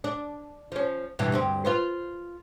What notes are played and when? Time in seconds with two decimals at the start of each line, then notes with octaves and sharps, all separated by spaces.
0.04 D4
0.72 F3 C#4
1.19 G2 B2 E3
1.32 D2 G2 C4
1.65 F4 B4 C5